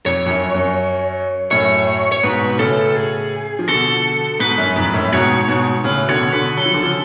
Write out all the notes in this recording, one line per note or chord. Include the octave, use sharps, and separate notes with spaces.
F2 C#5
F2
F#2
F#2
F#2 A2 C#5
C#5
G#2 B2 B4
B2
A2 C#3 A4
G#4
F3
B2 D3 A4
G#2 B2 B4
F#2
F2 G#2
F#2 A2
G#2 B2 C#5
G#2 B2
A2 C#3 B4
B2 D3 C#5
B2 D3 B4
F#3 A4
F3
D3
C#3 F3